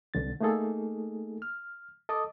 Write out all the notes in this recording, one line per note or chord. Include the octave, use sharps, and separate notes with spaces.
C2 D3 A6
A3 A#3 D#4 G#4 A4
F6
A4 D#5 A5 D6 D#6